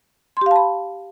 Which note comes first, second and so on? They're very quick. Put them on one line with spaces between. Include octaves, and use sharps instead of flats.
C6 G4 F5 A5 B5